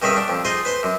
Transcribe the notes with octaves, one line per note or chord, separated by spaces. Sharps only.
G2 D#3 C#4 G#4 E5 B5
D4
F2
D#4 F4 G#4 C5 C6
B4 C5 C6
F#2